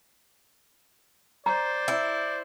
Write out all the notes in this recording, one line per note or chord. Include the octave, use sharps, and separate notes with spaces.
C5 D5 A#5
E4